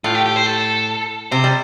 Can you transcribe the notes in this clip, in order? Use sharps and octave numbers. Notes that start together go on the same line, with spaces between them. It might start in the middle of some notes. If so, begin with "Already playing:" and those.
A2 F4
G4
G4
C5
A4
C3 C5
G3